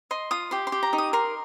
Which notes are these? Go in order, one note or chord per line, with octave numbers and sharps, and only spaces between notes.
D#5 C6
F4 D#6
G4 C6
C6
G4
A#5
D#4
D#6
A#4 C6